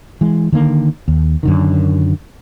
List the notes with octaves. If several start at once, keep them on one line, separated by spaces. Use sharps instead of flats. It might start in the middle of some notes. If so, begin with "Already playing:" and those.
E3 G#3
D3 D#3 A#3
D#2
F#2 D3 D#3